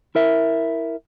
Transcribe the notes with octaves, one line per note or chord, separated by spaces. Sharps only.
E4 A#4 E5